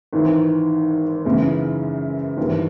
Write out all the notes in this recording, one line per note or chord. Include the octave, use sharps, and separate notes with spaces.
G#1 G#2 E3
F#2 C#3 E3 G#3
G#1 G2 E3